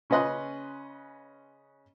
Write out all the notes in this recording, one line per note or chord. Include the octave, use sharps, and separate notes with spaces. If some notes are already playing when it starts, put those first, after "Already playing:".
C#3 C#4 B4 D#5 C6 F#6